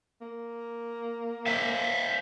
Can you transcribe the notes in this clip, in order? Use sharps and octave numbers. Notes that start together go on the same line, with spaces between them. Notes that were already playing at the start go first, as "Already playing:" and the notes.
A#3
C5 E5 F5